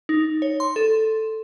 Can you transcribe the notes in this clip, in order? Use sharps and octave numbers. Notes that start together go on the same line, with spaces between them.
D#4
C#5
C6
A4